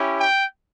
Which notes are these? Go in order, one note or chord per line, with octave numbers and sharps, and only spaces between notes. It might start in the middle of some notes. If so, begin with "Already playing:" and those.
Already playing: C#4 E4 G4
G5